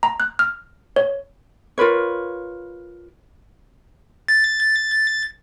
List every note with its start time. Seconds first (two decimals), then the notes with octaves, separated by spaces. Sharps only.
0.03 A#5
0.20 F#6
0.39 F6
0.96 C#5
1.78 F4 A#4 B4 C#5
4.28 A6